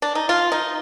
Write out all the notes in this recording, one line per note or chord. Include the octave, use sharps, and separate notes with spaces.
D4
D#4
F4
D#4